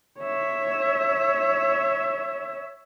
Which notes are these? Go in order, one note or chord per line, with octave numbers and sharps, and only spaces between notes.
C#5 E5